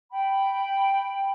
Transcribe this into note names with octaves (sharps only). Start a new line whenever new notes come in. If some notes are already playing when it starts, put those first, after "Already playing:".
G5 B5